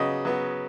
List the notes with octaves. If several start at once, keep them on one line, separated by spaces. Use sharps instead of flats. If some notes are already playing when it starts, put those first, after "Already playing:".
Already playing: C#3 F#3 B3 D#5
F#3 B3